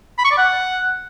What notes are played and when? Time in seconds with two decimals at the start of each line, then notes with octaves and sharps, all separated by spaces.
0.18 B5
0.25 C#6
0.31 D5
0.38 F#5